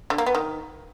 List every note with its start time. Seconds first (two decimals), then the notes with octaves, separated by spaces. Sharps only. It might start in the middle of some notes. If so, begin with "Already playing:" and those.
0.10 D3
0.18 A#3
0.26 B3
0.35 D#3